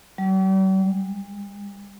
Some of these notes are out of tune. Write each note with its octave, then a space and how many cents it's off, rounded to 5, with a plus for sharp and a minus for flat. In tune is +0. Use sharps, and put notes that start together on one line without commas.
G3 -45
G3 +45